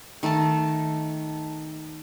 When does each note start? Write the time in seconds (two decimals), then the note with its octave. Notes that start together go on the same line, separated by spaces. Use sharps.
0.23 D#3 A3 A4 A5